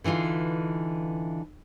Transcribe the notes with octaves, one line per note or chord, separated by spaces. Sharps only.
D3 E3 D#4 F4 F5